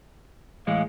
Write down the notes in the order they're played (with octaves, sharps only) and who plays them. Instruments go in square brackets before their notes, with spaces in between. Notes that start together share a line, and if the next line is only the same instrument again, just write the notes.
[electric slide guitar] A2 E3 G#3 [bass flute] F5